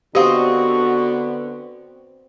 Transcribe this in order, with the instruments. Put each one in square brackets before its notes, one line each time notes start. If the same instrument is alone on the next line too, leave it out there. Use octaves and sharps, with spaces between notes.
[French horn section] D3 B3 [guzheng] C4 D#5 [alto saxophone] F#4 [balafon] G4 C5 F5